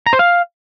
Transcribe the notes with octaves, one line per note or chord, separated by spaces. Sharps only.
A#5
C5
F5